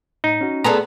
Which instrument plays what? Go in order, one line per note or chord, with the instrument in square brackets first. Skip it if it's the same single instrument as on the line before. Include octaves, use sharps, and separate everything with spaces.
[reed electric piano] A2 [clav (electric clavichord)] D#4
[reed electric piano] C#4 F#4
[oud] B3 G#4 A4 [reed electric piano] D5 C6 [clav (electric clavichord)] A#5